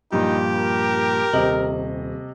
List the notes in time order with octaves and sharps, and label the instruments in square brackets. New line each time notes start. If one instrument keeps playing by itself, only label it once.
[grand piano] G2 A#2 F3 [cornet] D#4 [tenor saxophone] G4
[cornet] A#4
[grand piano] D#1 F#7 [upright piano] C3 D#5